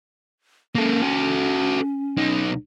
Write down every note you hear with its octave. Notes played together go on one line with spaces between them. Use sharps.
A#3 C#4 A4
F#4 A4
B1 D#4